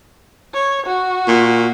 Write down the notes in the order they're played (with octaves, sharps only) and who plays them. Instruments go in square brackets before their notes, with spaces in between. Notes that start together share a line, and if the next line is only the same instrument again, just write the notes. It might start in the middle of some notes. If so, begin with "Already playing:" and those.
[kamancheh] C#5
F#4
[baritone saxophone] A#2